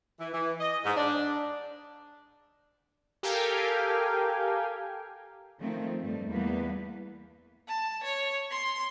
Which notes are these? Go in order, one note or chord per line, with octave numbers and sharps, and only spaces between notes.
E3
E3
D#5
G#2
D4
G4 A4 A#4 F5 G5 G#5
D#3 F3 A3 C4
G2 G3 A3
E2 E3 G3 A#3 B3 B4
A5
C#5
C6